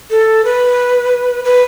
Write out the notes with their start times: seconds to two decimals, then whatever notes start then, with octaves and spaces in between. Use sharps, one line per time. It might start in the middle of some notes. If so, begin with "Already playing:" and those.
0.10 A4
0.44 B4
1.44 B4